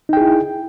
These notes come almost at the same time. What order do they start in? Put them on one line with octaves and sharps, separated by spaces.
D#4 G5 G#4 E4